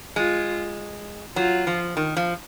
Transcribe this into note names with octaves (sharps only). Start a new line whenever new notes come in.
G#3 F4
F#3 F4
F3
D#3
F3